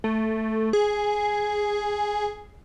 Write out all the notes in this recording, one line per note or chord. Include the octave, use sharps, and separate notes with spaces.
A3
G#4